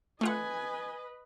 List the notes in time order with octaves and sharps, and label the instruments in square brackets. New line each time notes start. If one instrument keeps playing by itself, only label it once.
[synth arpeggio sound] A3 F4 F#5 [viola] B4 D#5 [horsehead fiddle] G#5